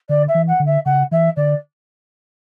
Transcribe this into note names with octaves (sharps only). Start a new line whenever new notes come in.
D3 D5
E5
E3
F#5
D3
E5
C#3 F#5
E3 E5
D3 D5